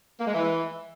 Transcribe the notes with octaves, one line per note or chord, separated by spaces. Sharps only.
A#3
G#3
E3